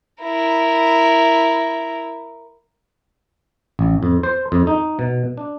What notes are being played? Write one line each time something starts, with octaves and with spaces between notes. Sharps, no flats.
E4 A#4
A1
F2
C5
F2
D#4
B2
D4